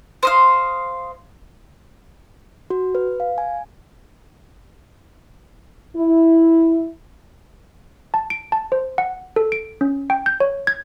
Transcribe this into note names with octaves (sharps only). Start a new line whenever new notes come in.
C5 D#5 F5
F#4
B4
F5
G#5
E4
A5
D7
A5
C5
F#5
A4
D7
C#4
G5
G6
C#5
G#6